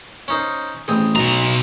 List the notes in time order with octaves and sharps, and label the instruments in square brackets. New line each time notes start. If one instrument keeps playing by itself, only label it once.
[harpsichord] C#4 D#4 C5
A1 C4 G#4
[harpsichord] B1 [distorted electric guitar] B2 A#5